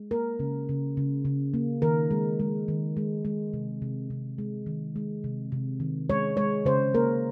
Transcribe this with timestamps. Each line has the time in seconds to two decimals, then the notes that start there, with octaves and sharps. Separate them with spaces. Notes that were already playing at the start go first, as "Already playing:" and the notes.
Already playing: G#3
0.11 A#3 A#4
0.39 C#3
0.69 C#3
0.97 C#3
1.25 C#3
1.54 A#3
1.82 D#3 A#4
2.11 G#3
2.40 G#3
2.68 D#3
2.97 G#3
3.25 G#3
3.53 C3
3.82 C3
4.10 C3
4.38 G#3
4.66 D#3
4.96 G#3
5.24 C3
5.52 C3
5.80 D#3
6.10 G#3 C#5
6.37 G#3 C#5
6.65 C#3 C5
6.94 A#3 A#4